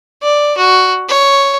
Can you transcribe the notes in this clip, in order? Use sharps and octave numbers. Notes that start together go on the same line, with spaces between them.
D5
F#4
C#5